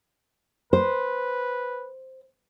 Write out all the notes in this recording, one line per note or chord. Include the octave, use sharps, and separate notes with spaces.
B4 C5